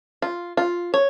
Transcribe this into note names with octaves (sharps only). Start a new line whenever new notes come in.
F4
F4
C#5